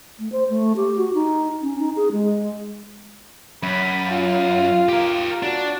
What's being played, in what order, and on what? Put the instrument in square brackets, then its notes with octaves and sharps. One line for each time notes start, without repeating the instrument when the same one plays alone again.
[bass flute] A3
C5
A3
G4
F#4
D#4
C#4
D#4
G#4
G#3
[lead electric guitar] F#2 [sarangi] B5
[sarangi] F4
[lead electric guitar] G4 A#4
[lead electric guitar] D4 [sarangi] F#4